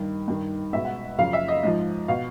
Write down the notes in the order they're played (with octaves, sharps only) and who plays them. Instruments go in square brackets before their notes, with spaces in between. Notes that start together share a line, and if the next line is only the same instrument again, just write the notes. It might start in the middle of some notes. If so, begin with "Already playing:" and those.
Already playing: [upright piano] G2 D#3
G2 D#3
C#2 B2 E5
F#5
F#2 C#3 F3 F5
E5
D#5
G#2 F3 D#5
B2 F5